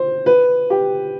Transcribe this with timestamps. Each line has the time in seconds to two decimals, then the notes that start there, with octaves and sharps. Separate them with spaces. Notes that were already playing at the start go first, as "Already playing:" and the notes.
Already playing: C5
0.26 B4
0.70 G4